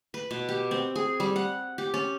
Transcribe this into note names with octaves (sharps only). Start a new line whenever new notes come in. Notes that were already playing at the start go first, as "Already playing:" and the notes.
B4
B2
G4
C4
G#4
G3
F#5
G4
C#4